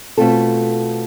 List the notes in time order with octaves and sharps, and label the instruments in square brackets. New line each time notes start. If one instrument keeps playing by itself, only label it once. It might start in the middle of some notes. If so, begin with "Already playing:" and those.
[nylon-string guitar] B2 A3 C4 F4 A4